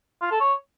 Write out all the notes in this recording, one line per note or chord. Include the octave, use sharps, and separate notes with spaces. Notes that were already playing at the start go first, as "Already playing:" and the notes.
F4
A4
C#5